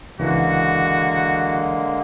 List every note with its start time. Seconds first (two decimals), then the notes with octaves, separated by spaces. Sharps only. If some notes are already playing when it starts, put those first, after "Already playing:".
0.20 C#2 D3 E3 G#3 A#3 F#4